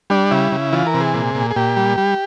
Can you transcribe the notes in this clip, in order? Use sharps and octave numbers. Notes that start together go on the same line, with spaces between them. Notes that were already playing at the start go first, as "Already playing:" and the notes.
G3 D4
C#3 E4
C#3
E3 F4
A#4
C3
G#4
A#2
A#2
G#4
A#2 G4
G3
G3